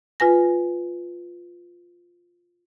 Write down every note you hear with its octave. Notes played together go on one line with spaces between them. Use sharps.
F4 B4 G#5 A#6